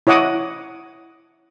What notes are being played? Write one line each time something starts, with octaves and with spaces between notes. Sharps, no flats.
E4 C#5 D#5 F#5 D6 D#6